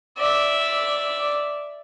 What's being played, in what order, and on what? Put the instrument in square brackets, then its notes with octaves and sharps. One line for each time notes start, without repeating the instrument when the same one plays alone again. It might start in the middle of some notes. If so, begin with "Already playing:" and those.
[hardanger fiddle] D5 E5